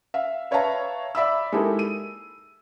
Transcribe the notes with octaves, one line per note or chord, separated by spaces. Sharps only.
E5 F5
B4 C#5 E5 F5 A5 A#5
D5 E5 B5 E6
G#3 A#3 D#4 E4 G4 A4
D#7